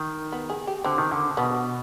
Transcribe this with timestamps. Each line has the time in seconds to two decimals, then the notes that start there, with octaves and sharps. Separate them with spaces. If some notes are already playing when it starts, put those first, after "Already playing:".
Already playing: D#3
0.32 B3
0.50 G#4
0.67 G4
0.84 D3 C4
0.98 D#3
1.12 D3
1.37 B2 B3